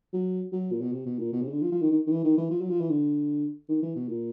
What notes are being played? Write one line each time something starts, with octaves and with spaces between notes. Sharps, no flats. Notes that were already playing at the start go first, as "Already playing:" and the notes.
F#3
F#3
A#2
B2
C3
B2
A#2
B2
C3
C#3
D3
F3
F3
D#3
D#3
D#3
E3
D#3
E3
F3
F#3
F3
E3
D3
D#3
E3
B2
A#2